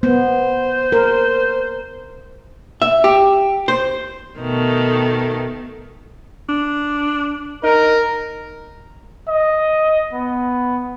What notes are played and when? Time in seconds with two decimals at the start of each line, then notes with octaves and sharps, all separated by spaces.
0.03 B3 C5
0.92 A#4
2.82 E5
3.04 G4
3.68 C5
4.38 B2 D#3 A3
6.49 D4
7.64 D#4 A#4
9.28 D#5
10.13 B3